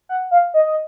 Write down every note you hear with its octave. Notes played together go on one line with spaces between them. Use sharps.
F#5
F5
D#5
D#5